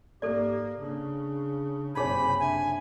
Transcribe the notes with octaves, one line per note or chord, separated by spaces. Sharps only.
G#2 A#3 G4 A4 D5
C#3 D4 G#4
F#1 C3 D#4 G#4 C5 C#5 G#5 B5
D4 E5 G#5